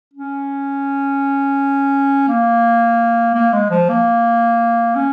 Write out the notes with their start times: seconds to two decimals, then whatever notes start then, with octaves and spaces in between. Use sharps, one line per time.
0.14 C#4
2.28 A#3
3.35 A#3
3.53 G#3
3.70 F3
3.89 A#3
4.96 C#4